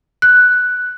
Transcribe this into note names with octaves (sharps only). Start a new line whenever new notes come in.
F#6